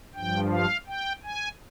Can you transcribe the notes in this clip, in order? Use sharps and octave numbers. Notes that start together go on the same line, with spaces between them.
G2 F3 G5
F5
G5
G#5